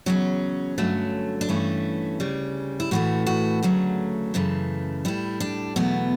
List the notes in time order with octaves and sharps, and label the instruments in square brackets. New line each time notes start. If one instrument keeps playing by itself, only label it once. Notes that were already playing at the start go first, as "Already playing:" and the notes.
[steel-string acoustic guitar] E2 C#3 F#3 C#4
G2 D3 F#3 A3
D4
G2 E3 A3 C#4
D2 C#3 G3
E4
A2 E3 A3 F#4
F#4
D2 C#3 F#3 A3
F#2 C#3 E3 A3
A2 G3 E4
D4
E2 B2 F#3 A3 B3